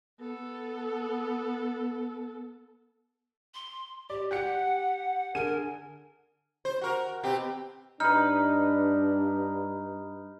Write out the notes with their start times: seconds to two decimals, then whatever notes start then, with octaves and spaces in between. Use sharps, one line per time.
0.19 B3 A4
3.54 C6
4.10 G4 D5
4.31 G4 F#5 F#6 C#7
5.35 D3 G#4 A#4 D#7
6.65 C5
6.81 F#4 A#4
7.23 B2 C4 G4
8.00 G2 D4 D#4 B4 F6